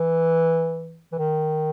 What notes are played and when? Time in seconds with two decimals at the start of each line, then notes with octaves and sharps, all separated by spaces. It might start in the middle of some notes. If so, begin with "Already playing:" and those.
Already playing: E3
1.12 E3
1.18 D#3